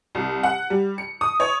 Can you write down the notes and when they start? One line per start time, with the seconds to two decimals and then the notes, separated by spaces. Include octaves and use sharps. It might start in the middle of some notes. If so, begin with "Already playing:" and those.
0.15 C2
0.43 F#5
0.70 G3
0.98 C#7
1.21 D#6
1.40 C#5